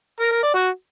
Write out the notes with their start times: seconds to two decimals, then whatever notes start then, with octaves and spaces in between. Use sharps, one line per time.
0.20 A#4
0.31 A#4
0.43 D5
0.54 F#4